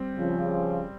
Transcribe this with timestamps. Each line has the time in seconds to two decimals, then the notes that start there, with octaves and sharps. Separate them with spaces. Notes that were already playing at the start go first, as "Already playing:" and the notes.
Already playing: G3 C4
0.16 C#3 F3